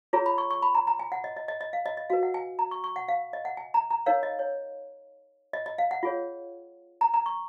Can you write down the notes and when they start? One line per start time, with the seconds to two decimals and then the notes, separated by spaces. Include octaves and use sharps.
0.13 F4 G#4 C#5 A#5
0.26 B5
0.38 C#6
0.51 C#6
0.62 B5
0.75 A#5
0.87 A#5
0.99 G#5
1.12 F#5
1.24 D#5
1.36 D#5
1.48 D#5
1.61 D#5
1.73 F5
1.86 D#5
1.97 D#5
2.10 F#4 B4 F5
2.23 F#5
2.34 G#5
2.59 A#5
2.71 C#6
2.84 C#6
2.96 F#5
3.08 F5
3.33 D#5
3.45 F#5
3.57 G#5
3.74 A#5
3.90 A#5
4.06 D#4 A#4 C#5 F5
4.23 D#5
4.39 C#5
5.53 D#5
5.66 D#5
5.78 F5
5.91 F#5
6.03 F4 G#4 C#5
7.01 A#5
7.14 A#5
7.26 C#6